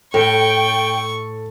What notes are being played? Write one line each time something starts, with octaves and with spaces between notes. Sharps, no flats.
A2 A4 G5 C#6